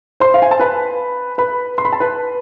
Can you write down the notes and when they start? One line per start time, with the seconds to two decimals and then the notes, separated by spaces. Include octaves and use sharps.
0.20 C5 C6
0.34 F5
0.42 G#5
0.51 A5
0.60 B4 B5
1.38 B4 B5
1.78 C6
1.85 B5
1.93 A5
2.00 B4 B5